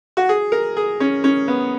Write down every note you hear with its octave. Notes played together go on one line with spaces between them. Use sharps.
F#4
G#4
A#4
G#4
C#4
C#4
B3